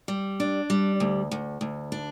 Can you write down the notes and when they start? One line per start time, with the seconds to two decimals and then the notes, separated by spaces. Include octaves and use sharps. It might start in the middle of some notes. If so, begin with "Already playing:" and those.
0.08 G3
0.40 D4
0.70 G3
1.00 D2
1.31 D2
1.61 D2
1.92 D4